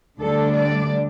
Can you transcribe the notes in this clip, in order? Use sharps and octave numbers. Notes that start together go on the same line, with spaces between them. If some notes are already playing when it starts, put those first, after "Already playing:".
D2 D3 G3 D4 A4
D5